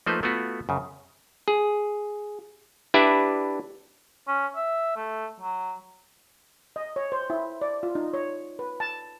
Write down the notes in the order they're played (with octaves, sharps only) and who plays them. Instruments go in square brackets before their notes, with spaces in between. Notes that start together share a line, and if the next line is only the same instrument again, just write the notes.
[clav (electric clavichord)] F3 A3 A#3 D#4 B4 C5
A3 B3 F4 F#4
F#2 C#3
G#4
D4 E4 G4 B4 D5 E5
[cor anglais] C#4
E5
A3
F#3
[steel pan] D#5
C#5
C5
E4
D5
F4
D#4
C#5
B4
A5